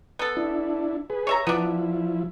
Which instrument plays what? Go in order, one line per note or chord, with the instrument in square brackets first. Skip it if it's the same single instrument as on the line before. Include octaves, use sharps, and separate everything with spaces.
[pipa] B3 A4
[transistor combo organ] D4 E4
G#4 B4
[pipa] C#5 E5 A#5
[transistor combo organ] F3 E4 [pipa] B3 D4